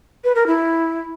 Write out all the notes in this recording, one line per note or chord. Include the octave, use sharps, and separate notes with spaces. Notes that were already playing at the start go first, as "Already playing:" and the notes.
B4
A#4
E4